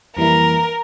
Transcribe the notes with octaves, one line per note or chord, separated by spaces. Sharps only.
F2 E3 G3 A#3 E4 A#4